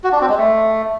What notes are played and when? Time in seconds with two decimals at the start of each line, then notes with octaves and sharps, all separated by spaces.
0.04 F#4
0.12 D4
0.21 C4
0.29 G#3
0.38 A3